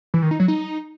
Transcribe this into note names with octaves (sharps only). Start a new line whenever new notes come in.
E3
D#3
D#4
F#3
D#4